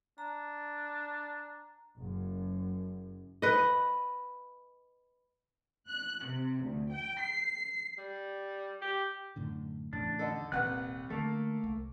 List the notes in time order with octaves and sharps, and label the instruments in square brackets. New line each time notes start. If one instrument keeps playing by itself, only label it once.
[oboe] D4 [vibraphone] A#5
[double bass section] F#1 F#2
[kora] B4 D#5
[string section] F#6
C3
D2
G5
C7
[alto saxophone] G3
G4
[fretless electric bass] F#2 A2 D3
[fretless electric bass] E2 A2 C#3 [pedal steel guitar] D4
[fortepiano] D3 D#4 A4
[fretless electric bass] D#1 A#2 G3 [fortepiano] C2 B4 F#5 [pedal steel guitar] F#6
[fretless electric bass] D3 [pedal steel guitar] A3 A#3 [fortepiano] A4
[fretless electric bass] C2